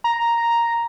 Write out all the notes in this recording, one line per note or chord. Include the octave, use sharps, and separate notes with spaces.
A#5